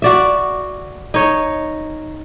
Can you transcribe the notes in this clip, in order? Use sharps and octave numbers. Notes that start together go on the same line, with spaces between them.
F#4 D5 E5
D#4 C#5